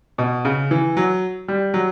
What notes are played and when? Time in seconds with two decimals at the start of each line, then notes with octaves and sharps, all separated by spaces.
0.18 B2
0.45 C#3
0.71 E3
0.97 F#3
1.48 G3
1.74 F#3